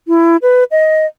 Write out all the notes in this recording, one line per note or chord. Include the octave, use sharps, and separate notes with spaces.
E4
B4
D#5